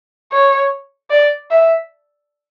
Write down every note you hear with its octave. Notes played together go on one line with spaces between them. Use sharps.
C#5
D5
E5